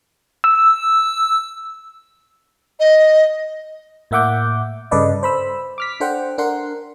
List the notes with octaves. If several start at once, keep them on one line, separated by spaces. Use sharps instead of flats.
E6
D#5
A2 A#3 E5 F#5 D6 G6
G2 C#3 A4 B4 D5 D#5
C5 B5 E6
D6 F6 B6
D4 A4 C5 F#5 G5
D4 A#4 F#5 C6